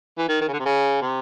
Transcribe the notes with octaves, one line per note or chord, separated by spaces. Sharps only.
E3
D#3
D#3
C#3
D3
C3
C#3
C3